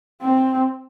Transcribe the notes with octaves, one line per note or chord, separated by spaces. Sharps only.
C4